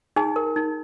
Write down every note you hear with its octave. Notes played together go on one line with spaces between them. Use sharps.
D#4 G#4 G#5
A#4
D#4